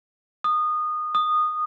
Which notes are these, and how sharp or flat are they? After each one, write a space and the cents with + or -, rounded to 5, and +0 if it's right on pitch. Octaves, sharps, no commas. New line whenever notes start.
D#6 -20
D#6 -15